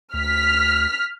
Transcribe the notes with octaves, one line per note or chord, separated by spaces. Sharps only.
D2 F6 B6